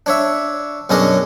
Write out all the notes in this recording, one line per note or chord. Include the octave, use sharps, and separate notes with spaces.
D4 C#5 E5
F#2 B2 C#4 D4 G#4 D#5